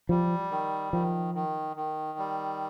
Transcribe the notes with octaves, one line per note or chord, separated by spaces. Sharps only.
F3 G3
D#3
D#3 F3
D#3
D#3
G3